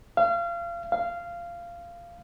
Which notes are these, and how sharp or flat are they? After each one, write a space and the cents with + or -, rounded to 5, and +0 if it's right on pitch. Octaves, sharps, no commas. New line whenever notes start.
F5 -30
F5 -15